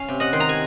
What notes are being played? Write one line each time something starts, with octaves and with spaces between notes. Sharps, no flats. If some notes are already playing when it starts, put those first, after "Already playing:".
Already playing: C#4 F5
C3
D#5 F#5
D#3 C6
A#5
G#5